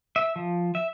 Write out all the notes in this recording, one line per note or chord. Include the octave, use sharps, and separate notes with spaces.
E5
F3
E5